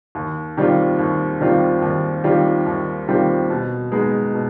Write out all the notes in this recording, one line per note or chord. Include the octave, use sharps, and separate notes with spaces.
D#2
D#3 G3 C4 F4
D#2
D#3 G3 C4 F4
D#2
D#3 G3 C4 F4
D#2
D#3 G3 C4 F4
B2
G#3 B3 D#4
B2